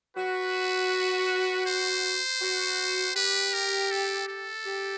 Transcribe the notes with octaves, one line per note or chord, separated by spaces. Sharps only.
F#4 B4
C5
F#4
G4 B4
A#4
A4
A4
G4